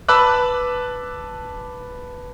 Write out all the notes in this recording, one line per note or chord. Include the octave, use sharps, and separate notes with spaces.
B4 A5 B5 D6 E6 F#6